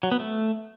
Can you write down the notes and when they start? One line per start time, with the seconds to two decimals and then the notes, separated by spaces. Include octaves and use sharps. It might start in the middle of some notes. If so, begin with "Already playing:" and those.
0.03 F#3
0.11 B3
0.20 A3